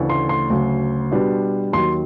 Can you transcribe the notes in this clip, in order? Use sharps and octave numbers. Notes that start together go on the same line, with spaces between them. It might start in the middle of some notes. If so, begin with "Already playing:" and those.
Already playing: D2 C#3 E3 A3 D4
C6
C6
D2 C#3 F#3
B2 G3 B3 D4
D#2 D#3 F#3 C6